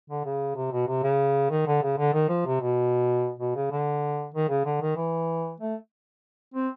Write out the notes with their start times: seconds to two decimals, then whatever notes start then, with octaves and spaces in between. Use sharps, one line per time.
0.10 D3
0.26 C#3
0.56 C3
0.72 B2
0.88 C3
1.03 C#3
1.51 D#3
1.67 D3
1.83 C#3
1.98 D3
2.13 D#3
2.29 F3
2.46 C3
2.61 B2
3.40 B2
3.56 C#3
3.71 D3
4.35 D#3
4.49 C#3
4.66 D3
4.81 D#3
4.96 E3
5.60 A3
6.54 C4